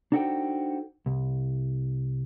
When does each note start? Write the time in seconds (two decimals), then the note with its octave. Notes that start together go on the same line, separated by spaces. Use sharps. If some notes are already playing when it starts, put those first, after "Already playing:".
0.12 D4 D#4 F#4 A4 C5 G5
1.06 C2